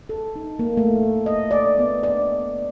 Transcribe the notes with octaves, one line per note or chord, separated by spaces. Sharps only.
A4
D#4
A#3
A3
D#5
D5
B3
D5